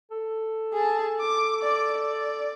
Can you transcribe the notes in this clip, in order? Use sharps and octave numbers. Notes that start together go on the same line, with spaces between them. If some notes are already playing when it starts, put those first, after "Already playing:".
A4
G#4 A5
D6
D5 D6
D5